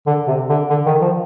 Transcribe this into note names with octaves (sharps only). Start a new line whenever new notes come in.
D3
C3
D3
D3
D#3
F3